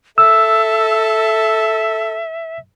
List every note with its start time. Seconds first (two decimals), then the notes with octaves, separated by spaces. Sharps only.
0.18 A4 E5 E6